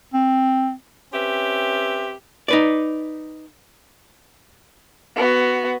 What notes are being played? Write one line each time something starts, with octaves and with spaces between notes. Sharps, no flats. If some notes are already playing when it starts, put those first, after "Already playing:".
C4
C4 C#4 G4 B4 E5
D#4 B4 D5
B3 F#4